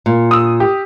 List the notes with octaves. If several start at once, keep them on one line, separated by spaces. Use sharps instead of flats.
A#2
D#6 E6
G4